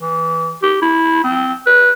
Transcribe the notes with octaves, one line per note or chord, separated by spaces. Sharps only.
E3
G4
E4
C4
B4